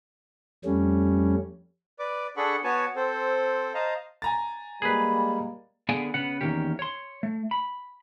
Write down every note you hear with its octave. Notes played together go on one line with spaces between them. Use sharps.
F2 G3 A3 C#4
B4 D5 D6
D4 G#4 A4 F#5 B5 C#6
B3 F#4 B4 C#5 G#5 A5
C4 A4 C5
C5 D#5 F5 A5 A#5
G#5 A#5 A6
G3 G#3 A#3 G#4 B4 B5
D3 B3 G#4 D5 F5 G#5
C#3 B3 F#5
E2 A#2 D#3 A#3 C#4 G4
C#5 C6
A3
B5